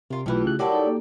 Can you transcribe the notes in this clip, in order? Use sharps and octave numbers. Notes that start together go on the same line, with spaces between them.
C3 F4 A#4
B1 E3 A3 E4 F4 G4 B4
C#3 F#6
F#3 G3 E4 F#4 G4 A#4 F#5 A5
D#4 A4
A#3